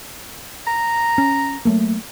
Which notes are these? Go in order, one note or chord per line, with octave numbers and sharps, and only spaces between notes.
A#5
C#4
F#3 A3 A#3